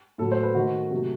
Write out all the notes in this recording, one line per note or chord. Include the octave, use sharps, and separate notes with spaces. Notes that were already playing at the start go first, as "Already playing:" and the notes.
A2 F#3 A3 A4
C5
B4
D#3 A3 F#4
C3 F#3 A3